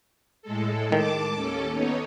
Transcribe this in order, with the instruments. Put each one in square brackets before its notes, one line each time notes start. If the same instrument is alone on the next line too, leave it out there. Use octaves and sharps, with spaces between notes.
[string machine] A2 G#3 A4
[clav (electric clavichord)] D#3 [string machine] A5 D6
[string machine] D#2 C#4 A4
B3 D#4 C#5